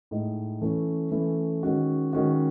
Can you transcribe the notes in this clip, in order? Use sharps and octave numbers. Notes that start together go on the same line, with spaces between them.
A2 G#3 D#4
E3 A3 C#4 E4
E3 A3 C#4 E4
D#3 G#3 C#4 F#4
D#3 G#3 C#4 F#4